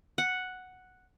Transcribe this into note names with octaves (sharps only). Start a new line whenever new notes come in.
F#5